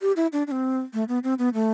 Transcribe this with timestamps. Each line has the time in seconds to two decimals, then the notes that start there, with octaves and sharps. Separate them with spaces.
0.02 G4
0.16 E4
0.33 D4
0.47 D4
0.51 C4
0.93 A3
1.08 B3
1.23 C4
1.39 B3
1.54 A3